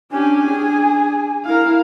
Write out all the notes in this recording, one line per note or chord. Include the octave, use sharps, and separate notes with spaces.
C#4 D4 G4 G#5
D4 G#4
E4 A#4 F5